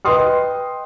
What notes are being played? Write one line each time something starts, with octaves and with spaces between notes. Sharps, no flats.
B4 D#5 G5 C6 D#6 F6